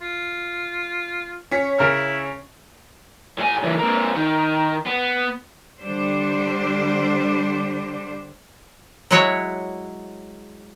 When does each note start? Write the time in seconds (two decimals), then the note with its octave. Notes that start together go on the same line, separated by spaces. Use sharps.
0.02 F4
1.51 C#4 C#5 B6
1.79 C#3 E4 A#4 F6
3.38 A2 G#5
3.63 C#3 E3
3.79 A#3 C4
4.15 D#3
4.86 B3
5.81 D3 G3 D4 C5
9.11 F#3 G#3 E4 F#4 C#5